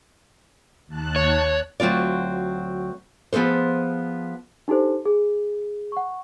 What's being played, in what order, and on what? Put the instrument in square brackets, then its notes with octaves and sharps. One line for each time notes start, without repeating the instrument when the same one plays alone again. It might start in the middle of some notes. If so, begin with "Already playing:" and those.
[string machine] D#2 A5 F#6
[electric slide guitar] C#5
[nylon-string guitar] D2 F#3 C4 F4 D5
F3 B3 G#4 A4 C5
[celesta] D4 D#4 G4 A4 C5
G#4
F#5 C#6